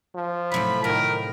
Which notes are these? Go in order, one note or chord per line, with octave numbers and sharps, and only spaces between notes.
F3
A2 C3 F#3 B5
A2 D#3 A#4